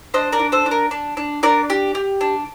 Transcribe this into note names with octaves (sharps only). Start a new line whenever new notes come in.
D4 C5 D#5
A#4 D5
D4
A4 C5
D4
A#4
D4
D4
D4 A#4 D5
G4
G4
D4